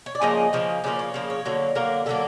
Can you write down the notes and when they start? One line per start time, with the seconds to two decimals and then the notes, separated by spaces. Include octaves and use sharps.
0.06 C#5
0.15 D5
0.22 C#3 F3 A#3 D#5
0.53 C#3 F3 A#3
0.84 C#3 F3 A#3 D5
0.99 C#5
1.14 C#3 F3 A#3
1.30 C#5
1.45 D3 F#3 A#3
1.75 D3 F#3 A#3 A#4
2.06 D3 F#3 A#3 A4